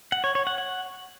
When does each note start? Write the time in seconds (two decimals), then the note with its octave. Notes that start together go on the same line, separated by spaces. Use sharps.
0.12 F#5
0.24 C#5
0.35 C#5
0.47 F#5
0.58 F#5